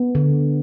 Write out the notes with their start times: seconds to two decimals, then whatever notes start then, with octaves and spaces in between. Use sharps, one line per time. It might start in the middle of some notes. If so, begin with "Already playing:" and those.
Already playing: B3
0.15 D3